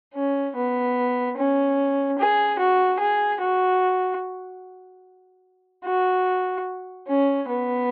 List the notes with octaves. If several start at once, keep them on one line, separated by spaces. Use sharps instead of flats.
C#4
B3
C#4
G#4
F#4
G#4
F#4
F#4
C#4
B3